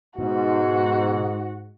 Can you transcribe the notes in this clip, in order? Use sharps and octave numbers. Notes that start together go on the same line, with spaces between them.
G#2 B2 F#4